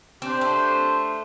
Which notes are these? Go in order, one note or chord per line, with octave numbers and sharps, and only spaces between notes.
C4 D4 G4 C5
A3